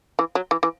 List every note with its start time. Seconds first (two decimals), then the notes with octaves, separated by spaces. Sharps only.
0.19 E3
0.35 F#3
0.51 E3
0.63 E3